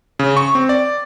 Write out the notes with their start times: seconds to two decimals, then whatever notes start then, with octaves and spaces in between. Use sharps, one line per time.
0.19 C#3
0.37 C#6
0.55 C4
0.69 D5